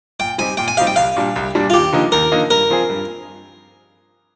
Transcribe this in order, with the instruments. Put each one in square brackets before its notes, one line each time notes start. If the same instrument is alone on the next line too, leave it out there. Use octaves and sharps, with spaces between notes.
[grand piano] A#2 [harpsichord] G5
[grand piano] G3 C4 D#4 G4 [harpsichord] G#5
[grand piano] A#2 [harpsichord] G5
[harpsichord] G#5
[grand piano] G3 C4 D#4 G4 [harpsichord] F5
[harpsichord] G5
[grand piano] C2 [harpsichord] F5
[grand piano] A#2 G3 D4
C2
A#2 G3 D4
[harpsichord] F4
[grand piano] D#2 [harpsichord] G4
[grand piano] D3 F3 A#3 D#4
[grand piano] D#2 [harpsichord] A#4
[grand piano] D3 F3 A#3 D#4
[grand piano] G2 [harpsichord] A#4
[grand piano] F3 C4 F4 G#4
G2